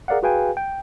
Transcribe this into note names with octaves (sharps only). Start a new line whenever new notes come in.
G#4 A#4 D5 F5 F#5
F#4 G#4 B4 F5 G5 G#5
G5